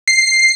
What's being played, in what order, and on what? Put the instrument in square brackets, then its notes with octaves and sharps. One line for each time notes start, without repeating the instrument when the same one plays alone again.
[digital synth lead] C7